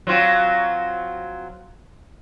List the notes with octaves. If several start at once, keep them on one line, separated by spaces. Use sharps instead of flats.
F#3 C4 F4